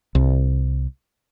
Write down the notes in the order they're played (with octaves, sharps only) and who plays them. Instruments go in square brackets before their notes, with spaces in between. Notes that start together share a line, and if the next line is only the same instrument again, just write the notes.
[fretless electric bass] C2